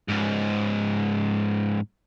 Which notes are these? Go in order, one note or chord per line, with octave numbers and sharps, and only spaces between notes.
C#2 G#2